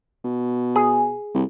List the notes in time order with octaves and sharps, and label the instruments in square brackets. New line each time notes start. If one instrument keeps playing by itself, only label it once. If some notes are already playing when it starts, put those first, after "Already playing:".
[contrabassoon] B2
[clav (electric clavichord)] G#4
[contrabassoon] C2